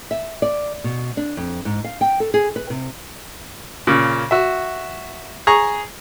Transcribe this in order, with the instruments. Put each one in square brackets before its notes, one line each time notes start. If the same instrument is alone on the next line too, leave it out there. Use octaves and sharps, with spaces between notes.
[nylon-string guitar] E5
D5
B2
D4
F2
G#2
F5
G5
A4
G#4
B4
C3
[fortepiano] A#2 C#3
F#4 E5
G#4 A#5 C#6